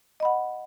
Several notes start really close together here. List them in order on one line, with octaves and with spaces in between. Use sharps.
D#5 B5 F#5